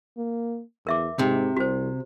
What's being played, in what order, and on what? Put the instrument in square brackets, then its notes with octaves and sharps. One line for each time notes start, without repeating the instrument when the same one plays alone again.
[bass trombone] A#3
[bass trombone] E2 [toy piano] A#4 E5 D6
[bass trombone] G#2 [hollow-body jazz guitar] C3
[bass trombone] C2 [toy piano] F#4 C5